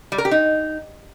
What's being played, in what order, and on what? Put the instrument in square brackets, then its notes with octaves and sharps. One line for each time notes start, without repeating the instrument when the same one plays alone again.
[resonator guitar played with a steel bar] G3
A#4
G4
D#4